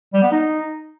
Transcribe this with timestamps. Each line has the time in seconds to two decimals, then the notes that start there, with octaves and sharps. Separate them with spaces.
0.14 G3
0.23 B3
0.32 D#4